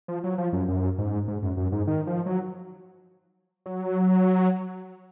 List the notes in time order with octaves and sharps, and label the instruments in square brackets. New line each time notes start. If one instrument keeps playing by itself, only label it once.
[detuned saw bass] F3
F#3
F3
F#2
F#2
G#2
G#2
F#2
F#2
G#2
D#3
F3
F#3
F#3